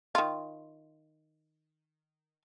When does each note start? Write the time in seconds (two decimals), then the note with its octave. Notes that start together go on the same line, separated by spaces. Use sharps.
0.15 D#3 F4